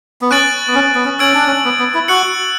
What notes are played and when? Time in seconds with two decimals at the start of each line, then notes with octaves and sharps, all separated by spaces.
0.21 B3
0.31 C#4 C#6 F#6 A6 D7 F#7
0.67 B3
0.75 C#4
0.95 B3
1.05 C#4
1.19 C#4 E6 G#6 D7 F#7
1.34 D4
1.47 C#4
1.64 B3
1.79 B3
1.94 E4
2.08 F#4 F#6 C#7 F#7